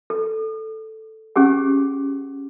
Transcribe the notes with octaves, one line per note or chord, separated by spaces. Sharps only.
A4
C#4 G4 G#4 F#5